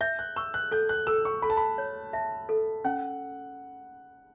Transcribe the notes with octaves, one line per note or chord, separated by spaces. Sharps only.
E5 G6
F#6
C#6 E6
F#6
A4 G6
F#6
A4 E6
C#6
A4 B5
A5
B5
C#5
E5 A5
A4
C#4 F#5